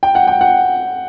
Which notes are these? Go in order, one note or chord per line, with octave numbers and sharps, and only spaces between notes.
G5
F#5
G5
F#5